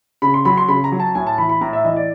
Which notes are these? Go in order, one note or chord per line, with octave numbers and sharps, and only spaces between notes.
C#3 B5
C6
F#3 B5
C6
C#3 B5
A#5
F#3
A5
A2 G#5
A5
E3 B5
B5
A2 A#5
E5
E3 D#5
D5